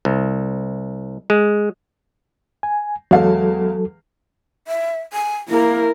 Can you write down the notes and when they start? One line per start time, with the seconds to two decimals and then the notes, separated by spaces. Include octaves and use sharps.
0.05 C2
1.30 G#3
2.63 G#5
3.11 E2 F#3 G#3 A4 F5
4.68 E5
5.13 G#5
5.49 A#3 E4 A#4